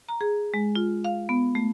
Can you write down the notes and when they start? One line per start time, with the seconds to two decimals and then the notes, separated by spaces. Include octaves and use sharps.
0.09 A#5
0.21 G#4
0.54 G#3
0.75 F4
1.04 F5
1.29 B3
1.55 A3